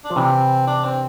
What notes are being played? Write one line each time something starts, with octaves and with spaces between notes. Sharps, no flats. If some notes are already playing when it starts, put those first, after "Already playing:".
D4
F3
C3 E3 C4
D4
C4